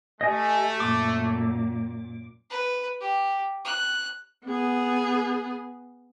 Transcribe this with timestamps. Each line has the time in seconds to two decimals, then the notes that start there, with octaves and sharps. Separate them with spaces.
0.21 A3 G4 D#5 G#5
0.80 F#2 A#2 D6
2.50 B4
3.01 G4
3.65 F#6
4.46 B3 G#4